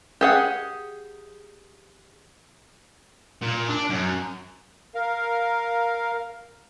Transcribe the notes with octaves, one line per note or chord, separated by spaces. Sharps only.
G4 G#4 F#5
A#2
D4
F#2
A#4 F5